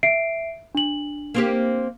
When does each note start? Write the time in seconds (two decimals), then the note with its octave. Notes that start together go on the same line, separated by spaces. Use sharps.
0.03 E5 C7 D7
0.75 D4 F#7
1.34 A#3 C4 G4